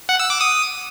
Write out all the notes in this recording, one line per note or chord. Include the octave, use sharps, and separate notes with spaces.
F#5
E6
D6
D#6